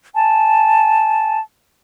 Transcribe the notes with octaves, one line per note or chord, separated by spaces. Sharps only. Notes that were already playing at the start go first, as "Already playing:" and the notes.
G#5 A5